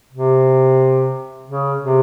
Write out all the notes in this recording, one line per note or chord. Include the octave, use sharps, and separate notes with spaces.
C3
C#3
C3